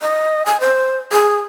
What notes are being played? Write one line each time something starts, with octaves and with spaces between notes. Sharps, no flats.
D#5
G#5
C5
G#4